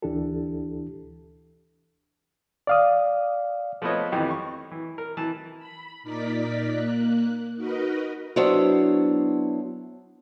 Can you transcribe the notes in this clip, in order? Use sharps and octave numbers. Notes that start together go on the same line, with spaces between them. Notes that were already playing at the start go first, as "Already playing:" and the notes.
D2 E3 D4 E4 G4 A4
D5 F5 D#6
F3 A3 B3 B4 C#5 D#5
F2 D#3 E3 D#4 G4
C#6
E3
A#4
E3 A5
B5
A#2 D#4 A#4 D5 B6
A#3 F#6
D#4 F#4 A#4 B4 D#5
F#3 B3 D4 E4 C5 C#5